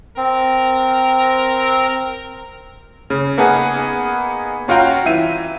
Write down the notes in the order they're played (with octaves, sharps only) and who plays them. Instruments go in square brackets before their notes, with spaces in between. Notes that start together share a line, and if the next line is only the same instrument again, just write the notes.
[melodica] C4 [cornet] A#4
[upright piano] C#3
A#3 B3 D#4 G#4 F#5 G#5
C#4 F4 F#4 F5 G5 A#5
E3 E5 D#7